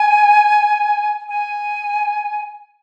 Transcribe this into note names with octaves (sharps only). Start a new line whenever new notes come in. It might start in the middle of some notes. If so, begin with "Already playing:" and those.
Already playing: G#5
G#5